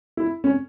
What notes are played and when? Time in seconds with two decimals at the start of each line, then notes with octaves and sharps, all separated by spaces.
0.17 E4
0.44 C#4